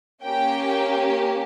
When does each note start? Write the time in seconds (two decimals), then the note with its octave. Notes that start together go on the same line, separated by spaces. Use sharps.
0.24 A#3 C#4 G4 G5